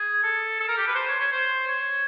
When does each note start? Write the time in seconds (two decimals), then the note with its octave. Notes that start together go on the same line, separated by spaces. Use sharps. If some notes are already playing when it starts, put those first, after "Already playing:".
Already playing: G#4
0.23 A4
0.60 A4
0.68 A#4
0.77 G4
0.87 B4
0.95 C5
1.08 C#5
1.20 C#5
1.32 C5
1.68 C#5